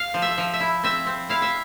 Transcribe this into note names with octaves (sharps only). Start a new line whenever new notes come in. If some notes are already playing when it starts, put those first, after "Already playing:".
Already playing: F5
F3
E5
F3
E5
E4
C4 E5
C4
E4 F5
E5